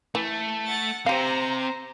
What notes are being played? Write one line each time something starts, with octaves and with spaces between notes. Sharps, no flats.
E3 A3
F#5 A6
C3 G4 C5 F5 A#5